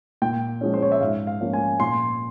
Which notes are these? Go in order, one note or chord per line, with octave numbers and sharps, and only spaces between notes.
A#2 G5
F3 G#3 C#4
C5
C#5
E5
G#2 F5
F5
F3 A#3 C#4
G#5
A#2 C6